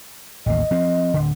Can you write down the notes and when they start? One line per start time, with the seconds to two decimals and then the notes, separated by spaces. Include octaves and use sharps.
0.46 A1 D#2 D#5
0.71 F3 C4
1.14 D1 D3